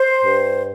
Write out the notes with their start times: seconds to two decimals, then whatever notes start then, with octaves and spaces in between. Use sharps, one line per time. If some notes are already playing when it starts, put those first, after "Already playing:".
Already playing: C5
0.24 G2